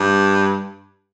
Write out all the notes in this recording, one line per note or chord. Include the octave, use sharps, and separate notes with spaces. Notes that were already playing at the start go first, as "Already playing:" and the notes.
Already playing: G2